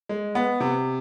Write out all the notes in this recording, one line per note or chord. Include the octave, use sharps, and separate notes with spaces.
G#3
B3
C3